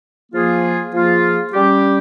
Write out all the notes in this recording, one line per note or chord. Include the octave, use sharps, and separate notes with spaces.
F3 A#3 F4 G#4
F3 A#3 F4 G#4
G3 C#4 G4